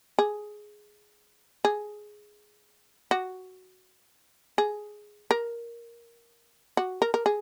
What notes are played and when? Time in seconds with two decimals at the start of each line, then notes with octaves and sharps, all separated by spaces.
0.19 G#4
1.65 G#4
3.11 F#4
4.58 G#4
5.31 A#4
6.77 F#4
7.02 A#4
7.14 A#4
7.26 G#4